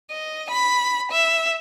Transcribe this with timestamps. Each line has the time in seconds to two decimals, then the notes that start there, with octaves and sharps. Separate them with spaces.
0.10 D#5
0.50 B5
1.12 E5